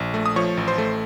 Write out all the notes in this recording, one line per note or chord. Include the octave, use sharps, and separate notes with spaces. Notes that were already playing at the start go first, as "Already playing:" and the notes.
Already playing: A#1
A3
D#6
F3 C#5 C#6
A1
C5 C6
A3